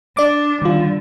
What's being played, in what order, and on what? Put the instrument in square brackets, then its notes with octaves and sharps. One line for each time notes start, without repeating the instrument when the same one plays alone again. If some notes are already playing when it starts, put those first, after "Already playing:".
[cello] D4 [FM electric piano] D5 D6
[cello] D3 G3 [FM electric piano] D#3 F4